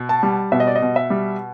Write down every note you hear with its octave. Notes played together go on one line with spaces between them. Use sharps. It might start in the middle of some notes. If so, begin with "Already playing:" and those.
Already playing: B2
A5
G3
B2 E5
D#5
D5
D#5
B2
E5
G3